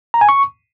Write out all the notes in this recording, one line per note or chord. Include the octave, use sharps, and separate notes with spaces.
A#5
G#5
C#6